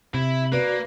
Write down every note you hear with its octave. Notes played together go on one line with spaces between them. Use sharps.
C3 E4
A#3 F#4 B4 D5